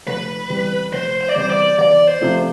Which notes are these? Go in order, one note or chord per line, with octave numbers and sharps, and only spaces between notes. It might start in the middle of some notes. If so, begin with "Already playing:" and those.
F1 B4
E2 C3 G3
F1 C5
C5
D5
E2 C3 G3 C5
D5
E2 D5
C5
C3 F3 A3